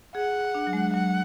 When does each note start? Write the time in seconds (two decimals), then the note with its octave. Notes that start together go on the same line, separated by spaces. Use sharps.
0.15 G#4 F#5
0.55 D4
0.67 F#3
0.73 G#3
0.93 F#3 F#5